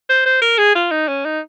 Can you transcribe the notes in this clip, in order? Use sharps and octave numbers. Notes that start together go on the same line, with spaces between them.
C5
C5
A#4
G#4
F4
D#4
C#4
D#4